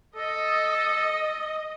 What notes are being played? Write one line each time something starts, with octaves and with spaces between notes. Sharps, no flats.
A4 D#5